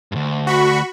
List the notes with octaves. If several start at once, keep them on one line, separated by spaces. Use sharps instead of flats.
D2 G2
F#4 B5 C#6